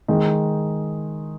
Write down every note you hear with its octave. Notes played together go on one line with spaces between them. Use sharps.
D#3 G#3 D#4